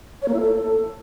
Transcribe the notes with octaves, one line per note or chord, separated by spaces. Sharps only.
C#5
A#3
E4
A4